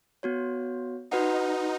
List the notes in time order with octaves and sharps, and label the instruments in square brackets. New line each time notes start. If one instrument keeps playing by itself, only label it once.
[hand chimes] B3 F#4 C#5
[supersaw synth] D#4 [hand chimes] F#4 B4 F#5